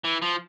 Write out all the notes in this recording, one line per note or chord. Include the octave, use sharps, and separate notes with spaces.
E3
F3